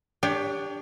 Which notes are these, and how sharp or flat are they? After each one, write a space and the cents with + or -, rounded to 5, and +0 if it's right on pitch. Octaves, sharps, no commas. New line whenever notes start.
D4 +0 G4 +20 C#5 +35